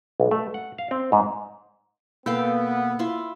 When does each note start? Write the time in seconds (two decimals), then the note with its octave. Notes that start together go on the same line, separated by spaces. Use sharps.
0.20 B1
0.31 A3
0.54 F#5
0.78 F5
0.91 C4
1.12 G#2
2.26 B2 A#3 B3 A4 F5 G5
2.99 E4 F4 E5